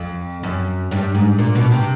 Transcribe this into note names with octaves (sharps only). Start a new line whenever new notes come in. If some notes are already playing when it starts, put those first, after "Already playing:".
Already playing: F2
F#2
G2
G#2
A#2
B2
C3